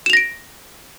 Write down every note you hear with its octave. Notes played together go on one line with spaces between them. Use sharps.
A#6 D7 E7 F7